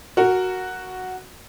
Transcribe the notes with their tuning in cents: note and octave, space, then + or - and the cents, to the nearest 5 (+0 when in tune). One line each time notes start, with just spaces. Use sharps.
F#4 +0 A#4 -10